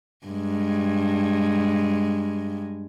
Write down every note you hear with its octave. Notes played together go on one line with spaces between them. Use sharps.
G2 G#3